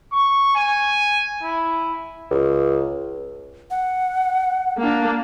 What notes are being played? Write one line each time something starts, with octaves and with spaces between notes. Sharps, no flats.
C#6
G#5
E4
C#2
F#5
A#3 D4